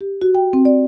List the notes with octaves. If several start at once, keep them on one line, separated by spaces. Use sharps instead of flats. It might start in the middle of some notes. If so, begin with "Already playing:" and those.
G4
F#4
G5
C4
D5